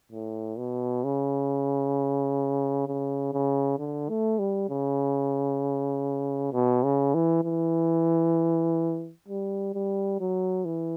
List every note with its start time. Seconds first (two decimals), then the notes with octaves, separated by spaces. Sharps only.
0.12 A2
0.58 B2
1.04 C#3
2.87 C#3
3.33 C#3
3.79 D3
4.09 A3
4.39 G3
4.70 C#3
6.53 B2
6.84 C#3
7.14 E3
7.44 E3
9.29 G3
9.74 G3
10.20 F#3
10.65 E3